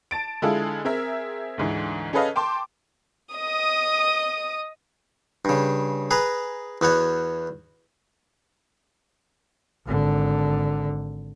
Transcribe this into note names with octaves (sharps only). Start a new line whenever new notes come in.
A5 A6 D7
D3 G#3 E4 F4 G#4 A4
C4 G#4 A#4 E5
D2 G#2 E3
C#4 G#4 A4 B4 D#5 F5
G5 A5 C6 D6
D#5 D#6
G2 C#3
G#4 B4 A#5
E2 B3 F#4 C#5
G#1 D3